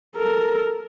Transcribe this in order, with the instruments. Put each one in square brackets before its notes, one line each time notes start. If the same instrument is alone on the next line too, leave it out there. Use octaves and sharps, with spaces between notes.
[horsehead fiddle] A4 A#4